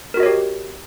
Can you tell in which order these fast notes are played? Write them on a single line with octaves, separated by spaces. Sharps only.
A#4 F#4 D#5 C#5 G4